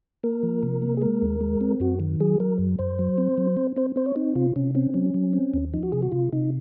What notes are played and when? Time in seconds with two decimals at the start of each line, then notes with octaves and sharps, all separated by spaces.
0.23 A#3 A#4
0.43 F3
0.63 C3
0.82 A#3
0.97 G#4
1.01 G#3 A#4
1.22 D#2
1.41 G#3
1.61 C4
1.80 F#2 F#4
2.00 D#3
2.20 F#3 G#4
2.40 F#3 A#4
2.59 F#2
2.79 F#2 C5
2.99 F#3
3.18 C4
3.38 F#3
3.57 C4
3.76 C4 C5
3.96 C4 C5
4.06 C#5
4.16 C4 D#4
4.35 C3 F4
4.56 C3 C#4
4.75 C4 C#4
4.94 F#3 C#4
5.14 F#3
5.33 C4
5.54 D#2
5.73 F3 D#4
5.83 F#4
5.92 C3 G#4
6.02 F#4
6.12 C3 F4
6.33 C3 D#4